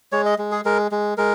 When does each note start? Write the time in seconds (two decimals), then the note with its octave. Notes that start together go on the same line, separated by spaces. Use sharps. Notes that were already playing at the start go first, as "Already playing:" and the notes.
0.12 G#3 C#5
0.26 D#5
0.38 G#3
0.52 G#4
0.65 G#3 A#4
0.91 G#3
1.17 G#3 A#4